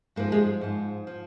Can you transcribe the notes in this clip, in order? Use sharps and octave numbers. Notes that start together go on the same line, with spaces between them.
G#2 F3 A#3
G#3
G#2 F3
F3